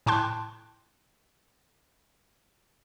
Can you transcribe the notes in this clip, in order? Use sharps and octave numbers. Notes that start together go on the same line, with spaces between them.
A2 G5 A5 C6 F#6